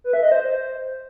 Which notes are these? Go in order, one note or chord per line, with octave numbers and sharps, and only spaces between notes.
B4
E5
D#5
C5